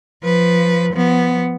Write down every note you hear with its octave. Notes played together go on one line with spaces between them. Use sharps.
F3 B4
F3 B3